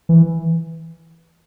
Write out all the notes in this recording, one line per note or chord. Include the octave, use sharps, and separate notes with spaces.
E3